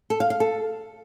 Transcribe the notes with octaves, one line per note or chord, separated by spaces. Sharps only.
A4
F5
F5
A4